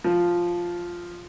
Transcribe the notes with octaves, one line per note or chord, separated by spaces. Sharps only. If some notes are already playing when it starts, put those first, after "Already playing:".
F3